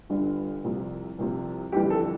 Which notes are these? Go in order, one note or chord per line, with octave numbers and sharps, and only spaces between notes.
G1 G2 D3 G3
C2 C3 F3
C2 C3 F3
G1 F2 E3 G3 G4
A4